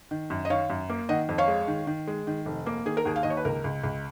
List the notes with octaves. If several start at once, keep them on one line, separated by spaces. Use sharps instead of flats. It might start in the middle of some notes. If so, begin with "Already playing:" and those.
D#3
F#2
D#5
D#3 C#5 F5
F#2
A#3
D#3 D#5 F#5
F2
C#5 F5
G#3
D#3
D#3
G#3
D#3
F1
A#3
D#3 G#4
A#4
D#2 G#4
F5
D#2 D#5
C#5
B4
C#2 A#4
C#2
C#2